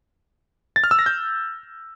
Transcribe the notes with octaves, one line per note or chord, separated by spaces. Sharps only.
A6
F6
E6
A#6
G6